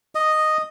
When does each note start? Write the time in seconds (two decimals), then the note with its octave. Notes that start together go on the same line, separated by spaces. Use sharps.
0.15 D#5